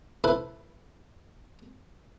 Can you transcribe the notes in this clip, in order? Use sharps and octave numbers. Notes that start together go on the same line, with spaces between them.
E4 A4 B4 C5 B5